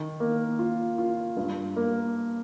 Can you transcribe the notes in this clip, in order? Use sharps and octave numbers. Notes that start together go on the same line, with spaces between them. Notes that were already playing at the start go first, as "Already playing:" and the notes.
Already playing: D#3
A#3
F4
F4
G2
A#3